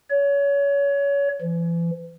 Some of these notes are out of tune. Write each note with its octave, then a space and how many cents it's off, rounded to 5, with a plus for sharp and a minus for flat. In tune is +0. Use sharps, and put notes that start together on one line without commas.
C#5 +25
E3 +40